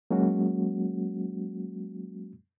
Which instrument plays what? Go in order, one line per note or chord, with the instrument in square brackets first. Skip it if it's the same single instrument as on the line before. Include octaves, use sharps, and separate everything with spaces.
[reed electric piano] F#3 G#3 A#3 C#4 F#4